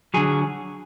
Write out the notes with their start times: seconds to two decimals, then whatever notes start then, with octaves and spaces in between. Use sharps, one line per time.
0.14 D3 F#3 G#4